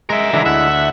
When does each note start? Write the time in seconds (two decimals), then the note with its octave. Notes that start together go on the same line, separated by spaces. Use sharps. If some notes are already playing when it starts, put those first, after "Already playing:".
0.10 G#3 A#4 E5
0.33 D3 E3 G#3 E4 A#5
0.46 D2 E5 F#5